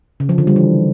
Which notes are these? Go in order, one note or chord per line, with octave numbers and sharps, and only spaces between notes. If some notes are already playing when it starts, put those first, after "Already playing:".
C#3
F3
D3
G3
E3